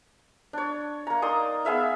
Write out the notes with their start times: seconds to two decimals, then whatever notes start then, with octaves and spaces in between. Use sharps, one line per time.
0.53 D4 C#5
1.07 A#3 A#5
1.22 D#4 D5 C6 D#6
1.65 B3 G#4 E5 F5